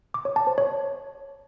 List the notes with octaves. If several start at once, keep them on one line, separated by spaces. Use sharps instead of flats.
D6
C#5
A5
C5
C#5